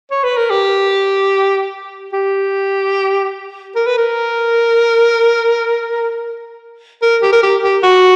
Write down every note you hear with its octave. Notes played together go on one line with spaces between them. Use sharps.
C#5
B4
A#4
G4
G4
A#4
B4
A#4
A#4
G4
A#4
G4
G4
F#4